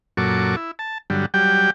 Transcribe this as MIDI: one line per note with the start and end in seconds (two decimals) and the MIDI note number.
0.17 0.56 42
0.17 0.56 46
0.17 0.56 54
0.17 0.56 69
0.17 0.56 85
0.17 0.56 86
0.56 0.71 64
0.79 0.98 81
1.10 1.26 43
1.10 1.26 50
1.10 1.26 54
1.10 1.26 55
1.34 1.70 54
1.34 1.70 55
1.34 1.70 67
1.34 1.70 79